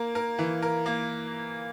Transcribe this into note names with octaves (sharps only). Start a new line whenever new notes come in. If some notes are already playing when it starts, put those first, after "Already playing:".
Already playing: A#3 A#4
A#4
E3
A#4
A#3